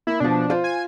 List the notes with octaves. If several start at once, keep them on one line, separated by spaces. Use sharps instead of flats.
A#3 E4
B2 F3 D4
F4 C5
G#5